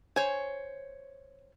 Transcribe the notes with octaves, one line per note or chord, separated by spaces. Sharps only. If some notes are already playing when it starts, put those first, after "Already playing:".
C5 C#5 G#5